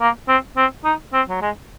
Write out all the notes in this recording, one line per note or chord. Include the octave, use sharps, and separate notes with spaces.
A#3
C4
C4
D#4
C4
F#3
G#3